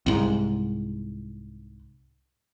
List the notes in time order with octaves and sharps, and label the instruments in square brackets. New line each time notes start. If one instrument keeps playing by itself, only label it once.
[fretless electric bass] C2 G#2